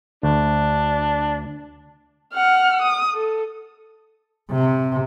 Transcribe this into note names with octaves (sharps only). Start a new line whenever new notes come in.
D2 D4
F#5 F6
D#6
A4
C3